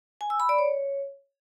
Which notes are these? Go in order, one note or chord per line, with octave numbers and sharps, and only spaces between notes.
G#5
E6
B5
D5
C#5